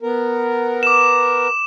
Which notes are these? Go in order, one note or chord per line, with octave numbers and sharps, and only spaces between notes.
B3 A#4
D6 E7